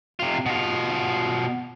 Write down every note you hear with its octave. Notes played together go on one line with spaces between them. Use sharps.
C3 F4
B2 F4